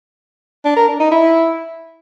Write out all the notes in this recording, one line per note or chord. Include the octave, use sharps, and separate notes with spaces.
D4
A#4
D4
D#4
E4